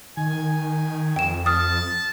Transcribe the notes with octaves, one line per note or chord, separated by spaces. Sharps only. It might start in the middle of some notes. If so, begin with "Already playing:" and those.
D#3 G#5
F2 G5 E7
A5 D#6 F6